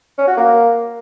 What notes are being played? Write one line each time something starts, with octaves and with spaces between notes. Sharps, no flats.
C#4
F#4
A#3